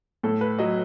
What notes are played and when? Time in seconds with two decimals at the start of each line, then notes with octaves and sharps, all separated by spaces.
0.23 A2 A4
0.41 B4
0.58 F#3 D#5